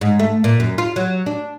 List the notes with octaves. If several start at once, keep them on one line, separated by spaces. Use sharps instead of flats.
G#2
A3
A#2
F#2
F4
F#3
D4